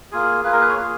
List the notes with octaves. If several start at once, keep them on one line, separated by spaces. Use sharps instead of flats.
A#3 F4 G#4
A#3 F4 G#4 B4
A#4
B4
C#5
A#3 F4 G#4